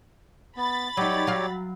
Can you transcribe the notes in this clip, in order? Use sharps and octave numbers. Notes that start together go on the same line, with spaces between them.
B3 B5 A6
F#3 D#4 G4 C#5 D5
F#3 F5